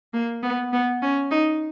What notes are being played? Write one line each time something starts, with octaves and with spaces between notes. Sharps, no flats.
A#3
B3
B3
C#4
D#4